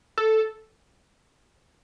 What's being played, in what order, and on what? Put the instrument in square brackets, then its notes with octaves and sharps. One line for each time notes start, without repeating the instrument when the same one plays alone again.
[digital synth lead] A4